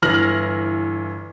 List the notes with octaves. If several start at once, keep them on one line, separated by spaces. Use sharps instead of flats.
G1 E3 F6 A#6 F#7